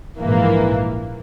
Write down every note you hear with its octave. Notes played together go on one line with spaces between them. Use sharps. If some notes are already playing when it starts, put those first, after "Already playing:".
A#1 G#2 E3 A#3